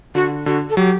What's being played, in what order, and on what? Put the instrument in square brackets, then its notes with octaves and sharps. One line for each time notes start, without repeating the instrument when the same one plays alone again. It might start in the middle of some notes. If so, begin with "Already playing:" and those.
[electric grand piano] D3 [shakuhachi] F#4
[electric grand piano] D3 [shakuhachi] F#4
[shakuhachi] A4
[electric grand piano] F#3 [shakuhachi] G4